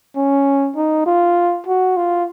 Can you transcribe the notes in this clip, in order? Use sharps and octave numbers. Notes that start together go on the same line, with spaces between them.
C#4
D#4
F4
F#4
F4